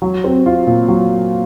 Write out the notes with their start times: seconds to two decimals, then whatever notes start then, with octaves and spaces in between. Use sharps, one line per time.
0.02 F#3
0.24 C4
0.46 F4
0.67 A#2
0.88 F#3